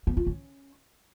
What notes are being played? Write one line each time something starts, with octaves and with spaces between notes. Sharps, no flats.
B3
F4
C#4